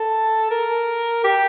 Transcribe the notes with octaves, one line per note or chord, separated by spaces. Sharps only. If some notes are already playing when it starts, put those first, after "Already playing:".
Already playing: A4
A#4
G4